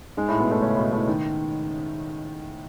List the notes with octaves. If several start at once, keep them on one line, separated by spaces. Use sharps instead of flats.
G#2 G#3
A2 A3
B2 B3
A2 A3
C#3 C#4
B2 B3
A2 A3
D#3